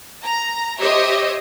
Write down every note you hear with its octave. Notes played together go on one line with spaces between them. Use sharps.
A#5
G4 C5 C#5 D#5 E5